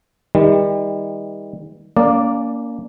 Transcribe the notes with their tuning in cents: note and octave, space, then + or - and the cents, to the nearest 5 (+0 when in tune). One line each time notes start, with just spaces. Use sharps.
D#3 +40 G3 +40
A#3 +0 C#4 +45 D5 +0